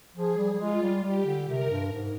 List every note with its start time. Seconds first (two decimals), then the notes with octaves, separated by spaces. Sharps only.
0.15 F3 G#4
0.38 G3
0.53 G3
0.60 G#3 F4
0.82 G3
1.04 G3 G4
1.26 D3
1.48 C3 A#4
1.70 G2
1.92 G#2